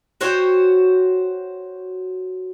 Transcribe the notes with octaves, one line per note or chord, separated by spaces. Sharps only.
F#4 C5 C#5 G5